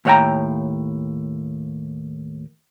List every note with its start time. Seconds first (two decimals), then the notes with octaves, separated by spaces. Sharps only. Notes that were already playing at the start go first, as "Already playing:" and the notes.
0.05 D#2 A2 C#5 F5 G5 A#5